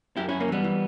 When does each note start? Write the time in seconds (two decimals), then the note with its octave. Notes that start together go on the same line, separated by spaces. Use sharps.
0.17 F#2 E4 G4
0.29 F#2 C#4 E4
0.40 A#3 C#4
0.48 E3 G3 B3
0.64 E3